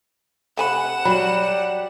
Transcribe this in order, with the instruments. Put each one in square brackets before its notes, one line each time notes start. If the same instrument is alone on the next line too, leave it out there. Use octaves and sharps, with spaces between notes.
[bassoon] C3 [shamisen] A3 G#5 B5 [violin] F#5 E7
[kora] F#3 F#4 [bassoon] G3 [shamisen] B5